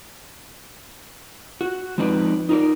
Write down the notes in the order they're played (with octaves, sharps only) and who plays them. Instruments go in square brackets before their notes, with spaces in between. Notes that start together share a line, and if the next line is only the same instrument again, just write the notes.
[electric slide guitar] F#4
F3 G#3 C4 D#4 B4 D5
D#4 F4 A#4 C5 D5